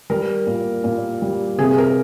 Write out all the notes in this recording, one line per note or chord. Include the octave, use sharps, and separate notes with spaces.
G3 A#4
A#2
A#2
G3
C3 G#4
A#4